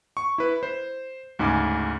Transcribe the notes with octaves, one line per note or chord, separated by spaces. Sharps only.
C#6
E4 B4
C5
D2 G#2 C#3 G#5 D6